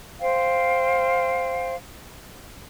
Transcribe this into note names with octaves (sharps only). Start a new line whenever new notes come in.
C5 F5 G5